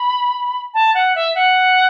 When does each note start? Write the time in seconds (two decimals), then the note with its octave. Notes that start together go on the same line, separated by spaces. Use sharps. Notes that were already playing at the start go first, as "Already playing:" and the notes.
Already playing: B5
0.74 A5
0.94 F#5
1.15 E5
1.35 F#5